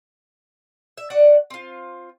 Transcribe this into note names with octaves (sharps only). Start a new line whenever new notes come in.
E5
F#4 D5 F#5
C4 F4